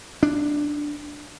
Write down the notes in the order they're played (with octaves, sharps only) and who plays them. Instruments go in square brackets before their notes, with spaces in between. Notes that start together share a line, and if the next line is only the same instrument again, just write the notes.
[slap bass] D4